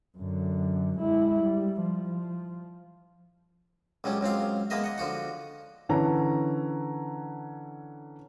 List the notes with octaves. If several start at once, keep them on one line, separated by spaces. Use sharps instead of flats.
F#2 D3
G#3 E4
G3
F3
C#2 F#3 G3 C#4
C#2 F#3 C4 F5
G#3 A#3 B3 A#4 D#5 E5
D#5 F#5
D3 F3 F#4 F#5
D3 E3 C#4 A#5